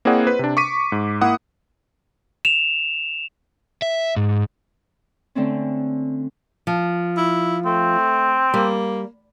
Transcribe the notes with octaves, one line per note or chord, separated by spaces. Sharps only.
A#3 C4 E4 G#4 D5 F#5
B4 C5
C3 D4
C#6 D6 B6 D#7
G#2
A#3 E4 F#5 D#6
E7 F7
E5
G#2
D3 A3 C4 C#4
F3
E4
A3 C4
G3 A#3